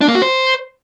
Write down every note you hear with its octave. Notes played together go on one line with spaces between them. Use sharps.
D4
A#3
F#4
C5